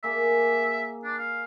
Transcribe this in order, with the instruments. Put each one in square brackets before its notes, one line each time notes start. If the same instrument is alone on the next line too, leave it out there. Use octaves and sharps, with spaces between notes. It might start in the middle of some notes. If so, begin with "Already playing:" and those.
[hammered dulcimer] A#3 G#4 [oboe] E5
[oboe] D4
F5